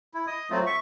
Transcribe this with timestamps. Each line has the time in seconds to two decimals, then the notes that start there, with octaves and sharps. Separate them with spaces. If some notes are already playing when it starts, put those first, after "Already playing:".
0.14 E4
0.27 D#5 D#6
0.50 F#3 A3 C4 F4
0.66 E5 C#6